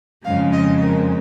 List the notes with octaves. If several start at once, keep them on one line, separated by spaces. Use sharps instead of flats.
F2 C#3 G#3 F5
D#5
A#4